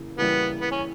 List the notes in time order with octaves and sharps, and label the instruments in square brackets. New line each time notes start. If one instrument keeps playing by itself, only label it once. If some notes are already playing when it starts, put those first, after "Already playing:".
Already playing: [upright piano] C#3 E3 A#3 E4
[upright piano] C#3 E3 G3 A#3 E4 [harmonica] B3
[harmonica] B3
C#4